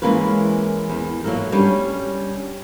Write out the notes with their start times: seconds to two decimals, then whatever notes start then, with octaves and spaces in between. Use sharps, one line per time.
0.02 E3 G#3 A#3 C#4 A#4 B4
0.89 E2
1.24 F#3 A#3 E4 A4 A#4
1.52 G3 C#4 D4